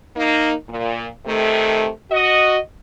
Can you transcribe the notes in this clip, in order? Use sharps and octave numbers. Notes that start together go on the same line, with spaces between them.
A#3 D#4
A#2
C3 D#3 A3
F#4 D#5